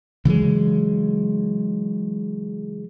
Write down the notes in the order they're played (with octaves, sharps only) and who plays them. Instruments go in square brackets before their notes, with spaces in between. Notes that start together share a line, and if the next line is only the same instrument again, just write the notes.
[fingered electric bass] C#3 E3 F#3 G#3